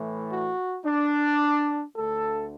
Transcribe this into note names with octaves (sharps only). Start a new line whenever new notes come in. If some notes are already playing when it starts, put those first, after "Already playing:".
Already playing: A2 E3 A3
F#4
D4
D2 D3 A3 A4